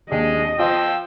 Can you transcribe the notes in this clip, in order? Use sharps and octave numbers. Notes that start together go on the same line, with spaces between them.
D#2 G#3 D4 D#5
F3 F4 C5 F5 G5 E6